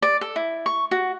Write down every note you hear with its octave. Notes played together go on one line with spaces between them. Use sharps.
D5
A4
E4
C#6
F#4